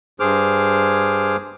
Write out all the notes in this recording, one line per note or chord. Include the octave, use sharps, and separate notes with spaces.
G2 G#4 C5 D6 F6